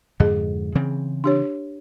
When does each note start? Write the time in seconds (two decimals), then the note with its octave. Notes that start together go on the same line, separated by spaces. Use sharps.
0.20 F2 G#2 D3 G#4 D#5
0.75 C#3 E3 C4
1.24 D4 G4 C#5